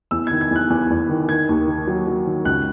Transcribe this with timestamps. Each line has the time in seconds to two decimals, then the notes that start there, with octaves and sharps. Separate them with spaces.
0.11 E2 E6
0.27 D#3 G#6
0.41 G#6
0.51 E2 F#6
0.70 E2
0.90 E2
1.09 D#3
1.29 D#3 G#6
1.49 D#2
1.67 D#3
1.87 F#3
2.07 F#3
2.27 D#3
2.45 C#2 F#6